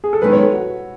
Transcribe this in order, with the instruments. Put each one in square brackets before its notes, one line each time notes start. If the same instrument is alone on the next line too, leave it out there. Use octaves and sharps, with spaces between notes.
[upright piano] G#4
A4
[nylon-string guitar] F#2 D#3 G#3 B3 D#4 [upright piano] B4
[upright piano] C#5
A4
F#4